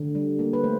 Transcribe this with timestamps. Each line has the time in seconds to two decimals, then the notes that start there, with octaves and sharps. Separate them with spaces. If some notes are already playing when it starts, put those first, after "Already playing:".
Already playing: D3
0.15 G3
0.39 A#3
0.53 B4
0.64 A3 C5